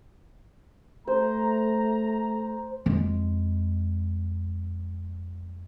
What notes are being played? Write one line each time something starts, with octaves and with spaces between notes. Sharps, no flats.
A3 C5 A#5
F2 G#3